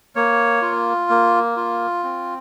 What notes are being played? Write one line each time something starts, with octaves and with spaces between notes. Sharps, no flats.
A#3 C#5
F4
A#3
F4
C4